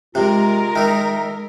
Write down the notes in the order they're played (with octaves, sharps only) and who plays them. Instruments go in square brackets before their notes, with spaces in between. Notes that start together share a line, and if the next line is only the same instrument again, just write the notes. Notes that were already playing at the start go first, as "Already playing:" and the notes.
[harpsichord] C3 [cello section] G#3 A#4 [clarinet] F4
[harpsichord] D#3 D#4 [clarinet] E5